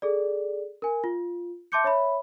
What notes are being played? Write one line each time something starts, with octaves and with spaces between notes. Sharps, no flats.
G#4 A4 D5
A#4 G#5
F4
E5 A5 C6 D6 G6 C#7
C#5 E5 B5